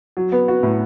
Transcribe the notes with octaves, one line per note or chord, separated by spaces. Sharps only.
F#3
B3
F#4
A2